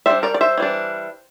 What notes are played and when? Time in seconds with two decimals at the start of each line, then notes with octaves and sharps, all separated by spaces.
0.06 G3 D4 C5 E5
0.23 A#4 D5
0.34 D5
0.41 C5 E5
0.58 E3 G3 D4